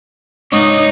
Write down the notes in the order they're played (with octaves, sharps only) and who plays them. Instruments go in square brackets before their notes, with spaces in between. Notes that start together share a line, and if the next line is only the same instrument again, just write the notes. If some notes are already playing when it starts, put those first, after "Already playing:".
[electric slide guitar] G#2 [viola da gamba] D#4 [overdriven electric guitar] C#5 D#5